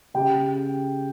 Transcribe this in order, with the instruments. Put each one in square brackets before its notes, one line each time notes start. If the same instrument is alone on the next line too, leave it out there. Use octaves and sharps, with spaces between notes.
[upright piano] C#3 G4 G5